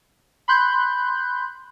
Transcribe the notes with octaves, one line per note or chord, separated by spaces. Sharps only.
B5 C6 F#6 G6